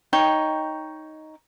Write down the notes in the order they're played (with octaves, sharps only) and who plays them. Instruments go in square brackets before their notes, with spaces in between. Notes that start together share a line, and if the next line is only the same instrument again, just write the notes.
[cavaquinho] D#4 C#5 G5